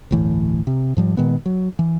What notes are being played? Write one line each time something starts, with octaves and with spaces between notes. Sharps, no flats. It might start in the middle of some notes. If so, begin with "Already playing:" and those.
D1 G1 A2 E3
C3
G#2 F3 G3
A#2 D#3 G#3 B3
F#3
E3